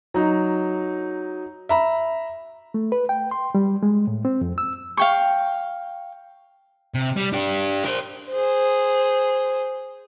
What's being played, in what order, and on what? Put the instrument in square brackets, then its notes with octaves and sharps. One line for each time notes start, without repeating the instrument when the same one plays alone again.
[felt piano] F#3 D#4
E5 A#5 B5
[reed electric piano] A3
B4
G5
C6
G3
G#3
A2
C4
F2
E6
[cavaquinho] F5 G5 C#6
[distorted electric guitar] C3
G3
D4 G4
A#4 C5
[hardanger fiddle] G#4 C5